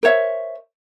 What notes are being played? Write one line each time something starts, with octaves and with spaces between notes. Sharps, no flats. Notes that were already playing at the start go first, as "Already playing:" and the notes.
A#4 C5 C#5 E5